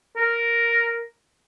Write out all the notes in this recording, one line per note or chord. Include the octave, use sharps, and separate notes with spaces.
A#4